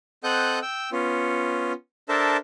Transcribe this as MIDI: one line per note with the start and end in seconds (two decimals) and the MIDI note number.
0.24 0.59 60
0.24 0.59 69
0.24 0.59 75
0.24 0.59 78
0.24 0.59 90
0.24 0.59 91
0.62 0.90 79
0.62 0.90 88
0.92 1.72 59
0.92 1.72 61
0.92 1.72 65
2.09 2.37 62
2.09 2.37 69
2.09 2.37 70
2.09 2.37 72
2.09 2.37 76
2.09 2.37 81